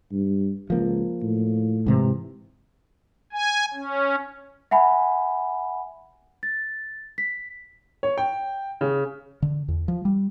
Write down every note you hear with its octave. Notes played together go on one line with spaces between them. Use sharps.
G2
C#2 F3 A#3
A2
G#2 C3 E3
G#5
C#4
E5 F#5 G#5 B5
A6
B6
C#5
G5
C#3
D3
E2
F3
G3